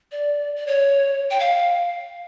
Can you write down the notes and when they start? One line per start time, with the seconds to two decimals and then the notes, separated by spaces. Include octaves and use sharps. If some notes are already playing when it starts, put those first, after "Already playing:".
0.12 D5
0.56 D5
0.67 C#5
1.31 G5
1.40 F5